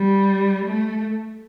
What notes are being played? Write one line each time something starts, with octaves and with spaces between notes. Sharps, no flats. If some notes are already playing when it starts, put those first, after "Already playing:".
Already playing: G3
A3